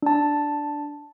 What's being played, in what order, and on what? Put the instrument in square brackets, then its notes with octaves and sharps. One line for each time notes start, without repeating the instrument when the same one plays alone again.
[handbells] D4 A5